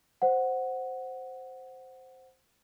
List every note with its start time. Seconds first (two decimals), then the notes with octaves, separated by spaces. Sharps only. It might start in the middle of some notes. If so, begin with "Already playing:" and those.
0.22 C5 F#5